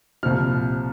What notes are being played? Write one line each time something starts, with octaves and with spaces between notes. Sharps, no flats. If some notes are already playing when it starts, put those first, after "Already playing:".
C2 A#2 F3 F6